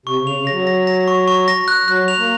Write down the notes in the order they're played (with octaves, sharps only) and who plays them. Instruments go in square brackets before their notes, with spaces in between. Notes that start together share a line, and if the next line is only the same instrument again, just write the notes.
[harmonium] C3 [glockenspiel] C#6
[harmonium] C#3
[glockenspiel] F7
[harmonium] C#3
[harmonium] F#3 [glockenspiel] A#6
[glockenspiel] A#6
A#6
C#6
C#6
A#6
F#6
[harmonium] F#3 [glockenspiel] F#6
[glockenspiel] F7
[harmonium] A#3